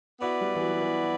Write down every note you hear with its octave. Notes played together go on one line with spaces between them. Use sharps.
B3 E4 F#4 B4 D5
G3
E3
F#3
F#3
E3